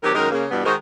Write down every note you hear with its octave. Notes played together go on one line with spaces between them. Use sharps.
C3 D#3 F#3 G4 A#4
F#2 D#3 G#3 A#4
C#3 A#3
E2 G2 B2 G3 B3
D#3 G#3 D#4 F#4 A#4 C5